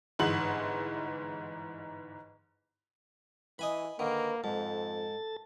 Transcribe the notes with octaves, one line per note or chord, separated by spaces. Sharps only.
G1 G#2 E3 G#4 F#5 F#7
E3 B4 D#5 G#5 B5
D3 D#3 A#3 B4
F2 G#2 A4 A6